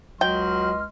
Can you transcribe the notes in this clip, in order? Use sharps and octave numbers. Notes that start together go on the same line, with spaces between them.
C#2 F#3 D#5 G5 C6 F6